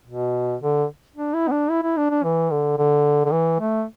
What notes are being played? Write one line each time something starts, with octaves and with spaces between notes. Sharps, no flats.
B2
D3
D4
E4
B3
D4
E4
E4
D4
D4
E3
D3
D3
D3
E3
A3